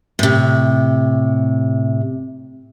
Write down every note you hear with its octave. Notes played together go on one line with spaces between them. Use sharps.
A2 C3